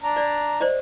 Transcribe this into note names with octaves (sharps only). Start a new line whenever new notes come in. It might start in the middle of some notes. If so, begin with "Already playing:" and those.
D4 A#5
D5
C5 D5 D#5